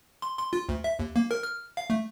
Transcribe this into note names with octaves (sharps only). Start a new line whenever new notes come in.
C6
C6
F4
D2
E5
D#2
A#3
A#4
F6
F5
A3